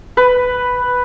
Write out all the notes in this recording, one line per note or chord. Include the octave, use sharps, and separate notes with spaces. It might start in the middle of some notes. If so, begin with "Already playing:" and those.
B4